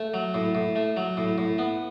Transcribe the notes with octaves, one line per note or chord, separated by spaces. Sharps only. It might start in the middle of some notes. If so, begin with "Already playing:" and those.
Already playing: A3
F#3
A2
A2
A3
F#3
A2
A2
B3